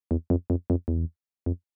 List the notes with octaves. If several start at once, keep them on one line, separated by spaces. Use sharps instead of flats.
E2
F2
F2
F2
E2
F2